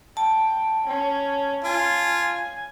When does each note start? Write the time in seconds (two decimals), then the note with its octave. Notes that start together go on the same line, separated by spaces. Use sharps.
0.17 G5 A5
0.86 C#4
1.64 F4 G#5